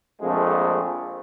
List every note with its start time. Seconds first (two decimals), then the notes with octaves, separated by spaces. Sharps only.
0.21 A#1 F2 F3 G#3 A3